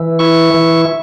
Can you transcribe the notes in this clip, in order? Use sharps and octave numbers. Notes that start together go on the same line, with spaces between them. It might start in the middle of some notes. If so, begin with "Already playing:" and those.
Already playing: E3
E4 C#6
E3